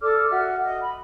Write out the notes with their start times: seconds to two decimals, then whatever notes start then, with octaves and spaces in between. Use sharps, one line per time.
0.01 A4 D5 D6 F6
0.30 F#4 E5 F6
0.62 D#5
0.80 B5